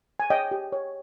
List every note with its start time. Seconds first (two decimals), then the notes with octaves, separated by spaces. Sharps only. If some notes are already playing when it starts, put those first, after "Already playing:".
0.20 G#5
0.30 C#5 D#5 G5
0.51 G4
0.73 C#5